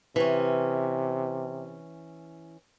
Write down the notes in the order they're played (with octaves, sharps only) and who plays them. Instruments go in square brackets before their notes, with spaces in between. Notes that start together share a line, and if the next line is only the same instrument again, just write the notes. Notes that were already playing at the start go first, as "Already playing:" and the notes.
[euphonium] C3 [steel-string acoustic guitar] E3 C#4